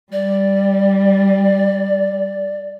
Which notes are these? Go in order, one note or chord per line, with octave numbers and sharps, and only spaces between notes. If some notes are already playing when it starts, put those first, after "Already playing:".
G3 D5